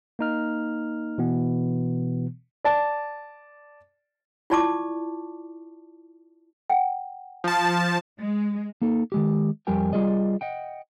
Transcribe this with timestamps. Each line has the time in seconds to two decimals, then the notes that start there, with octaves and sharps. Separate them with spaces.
0.19 A#3 D#4 F6
1.18 B2 E3 B3
2.65 D5 A5
4.50 E4 F4 D5 A5 C#6 D6
6.70 F#5 G5
7.44 F3 A5
8.19 G#3
8.82 A#3 D#4 A4
9.12 D#3 G#3 G4
9.67 F2 G3 G4 A#4 G5 G#5
9.93 G3 F4 G#4 D5 D#5
10.41 D#5 F#5 G5